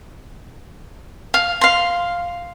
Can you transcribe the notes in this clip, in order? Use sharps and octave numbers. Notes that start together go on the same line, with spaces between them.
F5
F5 C6